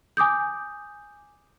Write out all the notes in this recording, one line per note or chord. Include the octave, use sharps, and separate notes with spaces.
G#5 D6 D#6 G6